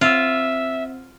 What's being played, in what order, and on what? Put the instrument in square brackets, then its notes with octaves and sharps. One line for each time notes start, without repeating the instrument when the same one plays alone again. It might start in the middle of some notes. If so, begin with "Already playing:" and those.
[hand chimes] C4 E6 [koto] F4 [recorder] E5